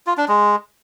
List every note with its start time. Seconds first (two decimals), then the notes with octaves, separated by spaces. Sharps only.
0.07 F4
0.17 D4
0.28 G#3